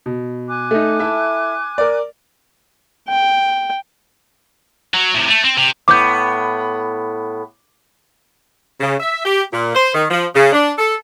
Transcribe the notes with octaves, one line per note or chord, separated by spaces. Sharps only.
B2
G#5 D6 F#6
A3 D#4
E4 A4 E5
A#4 D5
G5
F#3
A2 C3
A3
C4
C3
A2 B3 D6 G6
C#3
E5
G4
A#2
C5
D#3
F3
C#3
D4
A4